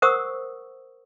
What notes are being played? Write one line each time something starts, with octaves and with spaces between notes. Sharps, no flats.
A#4 C5 F#5 C#6 D#6 E6